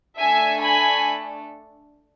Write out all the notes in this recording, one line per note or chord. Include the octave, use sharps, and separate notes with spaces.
A3 D4 A4 E5 G#5
G#5 B5